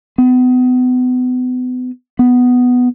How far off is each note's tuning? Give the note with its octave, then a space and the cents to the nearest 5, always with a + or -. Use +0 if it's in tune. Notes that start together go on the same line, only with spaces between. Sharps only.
B3 +35
B3 +5